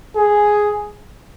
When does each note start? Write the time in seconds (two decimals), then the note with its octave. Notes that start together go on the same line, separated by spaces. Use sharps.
0.17 G#4